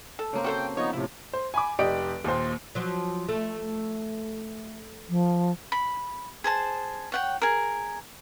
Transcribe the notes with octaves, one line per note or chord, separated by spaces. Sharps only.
A4
C#3 A#3 C4
F#4 A4 C5 G5
F3 B3 D#4 C#5
A2 C3 E4
C5
G#5 B5 D6
F1 G4 D5 D#5 D7
D#2 A#2 C5
F3 F#3
A3
F3
B5
G#4 C5 A5
C#5 F#5 G5
G#4 A#4